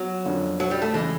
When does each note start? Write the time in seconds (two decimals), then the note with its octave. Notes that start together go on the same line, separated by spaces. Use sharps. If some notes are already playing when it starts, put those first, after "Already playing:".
Already playing: F#3 B3
0.25 F2 D3 F3 A#3 C#4
0.60 F#3
0.71 G3
0.82 A3
0.94 C#3 E3 G#3